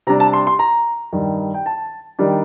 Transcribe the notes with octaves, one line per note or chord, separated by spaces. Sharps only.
C3 G3 D4 A#5
A5
C6
C6
A#5
G2 D#3 G3
G5
A5
D#3 G3 D4